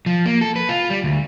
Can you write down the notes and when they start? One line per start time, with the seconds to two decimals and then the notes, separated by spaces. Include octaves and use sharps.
0.06 F3
0.26 A#3
0.41 A4
0.56 B4
0.69 F4
0.90 G3
1.04 D2